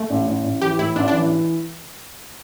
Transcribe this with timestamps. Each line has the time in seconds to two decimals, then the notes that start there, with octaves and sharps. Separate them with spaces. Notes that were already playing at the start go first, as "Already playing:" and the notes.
Already playing: A3
0.10 A1
0.27 A1
0.44 A1
0.62 E3 G4
0.79 A2 E4
0.96 A1 D4
1.08 D4
1.13 E3